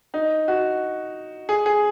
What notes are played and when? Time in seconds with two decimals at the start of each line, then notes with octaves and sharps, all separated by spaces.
0.14 D#4
0.48 F#4
1.49 G#4
1.66 G#4